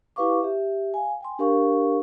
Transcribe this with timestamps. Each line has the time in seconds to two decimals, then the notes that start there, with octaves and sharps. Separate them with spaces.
0.16 E4 G4 B4 F5 C#6 D6
0.43 G4 E5
0.94 F5 G#5
1.21 G5 G#5 C6
1.39 D4 G4 A#4 F5 C#6